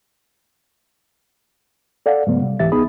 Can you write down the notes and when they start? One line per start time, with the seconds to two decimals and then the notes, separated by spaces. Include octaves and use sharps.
2.06 A4 D5 F5 F#5
2.27 G#2 C#3 F#3 A3 B3
2.41 C3 G3
2.59 C2 G#2 E3 G4 E5 A6
2.72 C#2 B3 D#4 G#4 B5 D#6